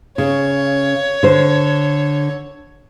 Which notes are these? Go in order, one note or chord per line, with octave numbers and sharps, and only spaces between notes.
C#3 C#5
D3 C5